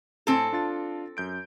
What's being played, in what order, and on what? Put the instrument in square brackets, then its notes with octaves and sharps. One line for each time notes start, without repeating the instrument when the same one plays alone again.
[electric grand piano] A2 G#5 [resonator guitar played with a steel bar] C4 A4
[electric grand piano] D4 F4 A6
F#2 G6 D7